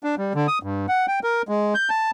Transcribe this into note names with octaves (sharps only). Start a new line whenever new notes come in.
D4
G3
D3
D#6
G2
F#5
G5
A#4
G#3
G6
A5